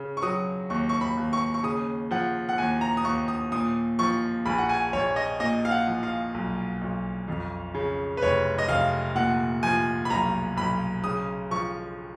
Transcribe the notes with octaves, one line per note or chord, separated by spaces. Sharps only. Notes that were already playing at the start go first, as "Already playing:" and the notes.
Already playing: C#3
C#6
F#3 D#6
D#2 C#6
C#6
B5
D#2
C#6
C#6
C#3 D#6
F3 F#5
F#5
D#2 G#5
A#5
D#6
D#2 C#6
D#6
A#2 D#6
F3 C#6
A#1 B5
F#5
G#5
A#1 C#5
D#5
A#2 D#5
F5
F#5
F3
F5
B1
B1
F2
C#3
B4
F1 C#5
D#5
F1 F5
A#2 F#5
F3 G#5
B5
B1 A#5
B1 B5
C#3 D#6
F3 C#6